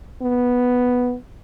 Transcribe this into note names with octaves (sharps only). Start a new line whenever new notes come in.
B3